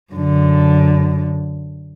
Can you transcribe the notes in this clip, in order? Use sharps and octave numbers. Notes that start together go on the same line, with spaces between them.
F#2 D3